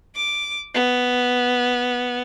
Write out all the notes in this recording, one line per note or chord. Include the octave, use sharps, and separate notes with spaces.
D6
B3